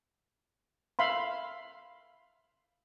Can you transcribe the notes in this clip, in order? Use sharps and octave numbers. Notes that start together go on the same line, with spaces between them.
E5 F5 B5 C6